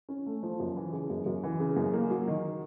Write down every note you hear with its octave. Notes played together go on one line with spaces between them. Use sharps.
C#4
A3
F3
F#2
E3
C#3
F#2
F#2
E3
C#3
F#2
A#3
F#3
D#3